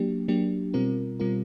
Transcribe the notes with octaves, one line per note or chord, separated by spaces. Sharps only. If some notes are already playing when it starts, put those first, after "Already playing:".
Already playing: F#3 A#3 D4 G4
F#3 A#3 D4 G4
B2 G3 C4 F4 A#4
B2 G3 C4 F4 A#4